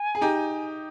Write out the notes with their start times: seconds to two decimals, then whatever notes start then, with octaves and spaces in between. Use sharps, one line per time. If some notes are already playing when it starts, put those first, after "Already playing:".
Already playing: G#5
0.15 G#4
0.21 D#4 G4